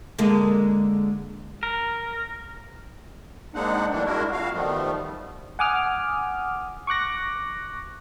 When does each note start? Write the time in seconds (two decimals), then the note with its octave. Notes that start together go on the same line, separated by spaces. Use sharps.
0.19 D3 G#3 A#3
1.63 A#4
3.54 G#3 A#3 C4 D4 D#4 F#5
3.91 E3 F#3 G3 A3 A#3 D4
4.06 G#3 D4 E4 F#4 A#4
4.32 F2 F#4 F5
4.53 D#3 F3 G3 A3 B3
5.59 F#5 G#5 D6 D#6 F6
6.87 C#6 D6 F#6 A#6